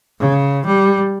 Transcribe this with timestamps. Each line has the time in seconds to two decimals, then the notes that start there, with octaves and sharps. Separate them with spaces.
0.20 C#3
0.66 G3